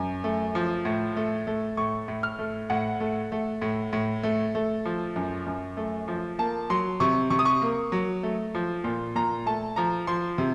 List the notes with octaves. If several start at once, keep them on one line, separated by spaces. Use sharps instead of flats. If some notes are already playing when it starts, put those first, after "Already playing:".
Already playing: F#2
A3
F3
A2
A3
A3
A2 C#6
A2
F6
A3
A2 F#5
A3
A3
A2
A2
A3
A3
F3
F#2
F#2
A3
F3
A#3 A5
F#3 C6
C3 C#6
C3 C#6
D#6
C#6
A#3
F#3
A3
F3
A#2
A#2 A#5
A3 A5
F3 A#5
F3 C6
C3